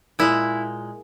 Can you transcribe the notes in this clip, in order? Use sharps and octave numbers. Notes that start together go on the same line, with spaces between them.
A#2 G#3 E4